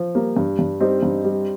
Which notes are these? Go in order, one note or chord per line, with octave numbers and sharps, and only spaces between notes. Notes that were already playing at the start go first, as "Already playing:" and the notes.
Already playing: F3
G3 A#3
G2
G2
G3 C4 D#4
G2
G3